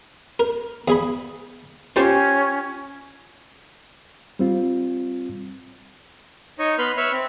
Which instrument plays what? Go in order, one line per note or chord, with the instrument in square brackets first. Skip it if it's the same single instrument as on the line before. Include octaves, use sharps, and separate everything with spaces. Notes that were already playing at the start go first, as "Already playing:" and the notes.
[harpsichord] A#4
E2 G#4 B5
[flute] C#4 [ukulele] F4 G4 C#5 [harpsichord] C5 A5 C6
[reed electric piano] G3 C4 F4
[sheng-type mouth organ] D#4 C#5 D#5
B3 B4 B5 C6 F6
B4 C#5 E5 F6
C4